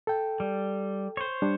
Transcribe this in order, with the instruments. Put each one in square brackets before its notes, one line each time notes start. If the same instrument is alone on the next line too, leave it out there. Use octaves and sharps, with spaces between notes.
[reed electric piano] A4 G5
[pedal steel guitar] G3
C5 C#5
[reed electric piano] G3 D4